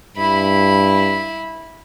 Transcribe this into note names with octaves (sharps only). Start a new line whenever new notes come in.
G2 E4 B5